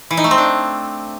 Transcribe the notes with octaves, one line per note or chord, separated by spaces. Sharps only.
E3
D#4
A3
C4
D4